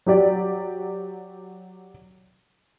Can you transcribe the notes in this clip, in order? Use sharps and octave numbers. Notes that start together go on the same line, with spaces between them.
F#3 G4 D5